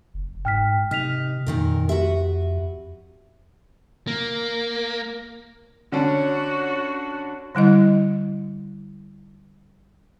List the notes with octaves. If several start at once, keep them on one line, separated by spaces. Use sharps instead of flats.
F#1
G#2 G5 F6 B6
C3 D#4 F6 B6 F7
F2 A#2 D#3 A#4
F#4 G4 B4 E5
A#3
D3 C#4 D4 F#4
D3 G3 E4 D#5